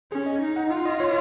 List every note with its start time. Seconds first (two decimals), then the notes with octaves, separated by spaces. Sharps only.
0.12 C#4 G#4
0.26 D#5
0.42 D#4
0.56 F#5
0.70 F4
0.86 D#5
1.00 C#5